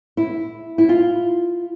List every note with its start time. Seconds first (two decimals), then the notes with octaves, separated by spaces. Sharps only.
0.17 E4
0.78 E4
0.89 F4